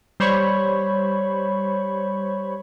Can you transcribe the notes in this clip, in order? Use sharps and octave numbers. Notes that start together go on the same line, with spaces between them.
G3 C5 C#5 B5 C#6